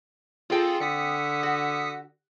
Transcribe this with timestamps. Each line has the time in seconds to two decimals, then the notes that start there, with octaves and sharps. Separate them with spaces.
0.50 C4 F4 G#4 A4 G5 A5
0.80 D3 D#6 B6 C#7
1.43 F#4